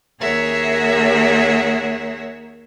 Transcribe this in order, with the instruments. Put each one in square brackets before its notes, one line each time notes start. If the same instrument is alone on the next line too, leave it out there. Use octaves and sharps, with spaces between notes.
[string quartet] D#2 G#4 A#4 C#5 E5 F#5